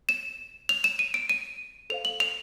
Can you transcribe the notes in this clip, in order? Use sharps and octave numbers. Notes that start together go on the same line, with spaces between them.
E7
F7
E7
D#7
D7
D#7
A4 C5 F5 F7
F#7
F7